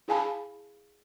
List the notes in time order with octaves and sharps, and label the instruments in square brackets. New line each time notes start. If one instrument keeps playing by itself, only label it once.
[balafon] E4 G#4 F5 G#5 A5 B5